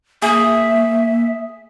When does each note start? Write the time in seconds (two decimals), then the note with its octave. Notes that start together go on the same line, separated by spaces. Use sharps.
0.22 A#3 G#4 E5